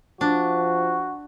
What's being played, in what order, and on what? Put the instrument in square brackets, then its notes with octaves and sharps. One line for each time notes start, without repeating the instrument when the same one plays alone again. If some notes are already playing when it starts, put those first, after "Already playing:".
[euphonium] F3 [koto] D4 [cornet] F#4